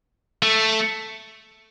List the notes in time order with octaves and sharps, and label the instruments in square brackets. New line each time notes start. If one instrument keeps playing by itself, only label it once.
[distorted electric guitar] A3